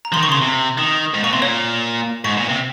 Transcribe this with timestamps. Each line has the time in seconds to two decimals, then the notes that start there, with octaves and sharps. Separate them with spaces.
0.05 A#5
0.12 D#3 F3 C6
0.23 C#6
0.29 C#3 C6
0.41 C3
0.78 D#3 D#6
1.14 G#2
1.24 A#2 C#6
1.33 C3 C6
1.42 A#2 C#5
2.25 G#2 C#6
2.37 A#2
2.49 C3